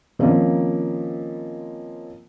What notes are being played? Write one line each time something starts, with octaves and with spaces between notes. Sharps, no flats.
D#3 F3 A#3 C4 C#4